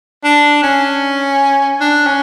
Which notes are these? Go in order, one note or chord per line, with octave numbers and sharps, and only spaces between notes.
D4
C#4
D4
C#4